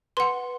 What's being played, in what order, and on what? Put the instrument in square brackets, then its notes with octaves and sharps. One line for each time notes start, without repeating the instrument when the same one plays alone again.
[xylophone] B4 F#5 C6